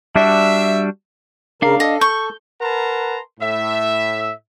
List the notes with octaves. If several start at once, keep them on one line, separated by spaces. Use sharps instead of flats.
G3 D4 F#4 E5
C#3 D4 A#4 F5
A4 D#5
C#6 G6
A#4 B4 F#5 A5 A#5 C6
A2 E5